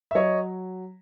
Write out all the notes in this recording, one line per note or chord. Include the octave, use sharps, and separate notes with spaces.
E5
F#3 C#5 D#5